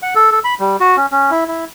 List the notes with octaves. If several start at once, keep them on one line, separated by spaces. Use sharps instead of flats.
F#5
A4
A4
B5
G3
F#4
C#4
C#4
E4
E4